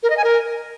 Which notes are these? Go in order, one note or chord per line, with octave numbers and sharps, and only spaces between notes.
A#4
D#5
G#5
A#4